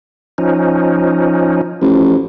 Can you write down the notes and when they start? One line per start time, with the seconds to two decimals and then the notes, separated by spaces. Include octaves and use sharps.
0.38 F3 C#4 D#4
1.82 A1 F3